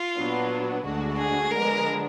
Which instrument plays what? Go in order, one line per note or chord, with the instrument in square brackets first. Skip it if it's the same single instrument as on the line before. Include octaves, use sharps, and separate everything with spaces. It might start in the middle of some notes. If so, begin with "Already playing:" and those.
Already playing: [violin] F4
[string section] A#2 F#3 B3 D4
D2 D3 G#3 D4 F#4
[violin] G#4
[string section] D3 F3 G#3 B3 D4 [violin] A#4